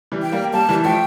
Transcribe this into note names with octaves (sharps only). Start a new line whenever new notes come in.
E3 G3
G5
G3 A#3
G3 A#3 A5
E3 G3
F3 A3 G5